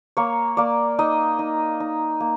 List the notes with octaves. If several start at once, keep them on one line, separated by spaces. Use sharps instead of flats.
A#3 C#5
A#3 D5
D#4 D#5
D#4
D#4
A#3